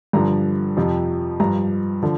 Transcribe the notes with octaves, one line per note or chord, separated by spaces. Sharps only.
G2 D3 F3 A#5
F2 C3 F3
G2 F3 A#5
D3 F3